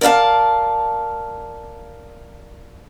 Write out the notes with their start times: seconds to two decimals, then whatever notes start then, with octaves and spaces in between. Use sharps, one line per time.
0.01 A#4 D5 E5 F5 A5